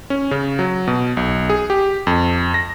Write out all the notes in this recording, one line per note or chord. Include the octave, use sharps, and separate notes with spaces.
C#4
C#3
F#3
B2
B1
G#4
G4
F2
A#6